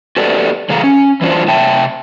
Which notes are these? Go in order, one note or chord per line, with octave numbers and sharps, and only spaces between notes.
F#4 G4 A4 B4 D5
C#3 E3 G#4 A4 F5 A#5
C#4
E3 F#3 D4 F4 C5
C3 E5 G5 A5